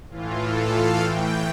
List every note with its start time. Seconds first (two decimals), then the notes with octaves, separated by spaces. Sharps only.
0.11 A2 E3 F4
0.41 A4
0.71 F5
1.01 A2 E3 G5